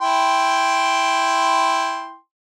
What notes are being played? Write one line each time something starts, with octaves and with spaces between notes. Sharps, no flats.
E4 G5 C6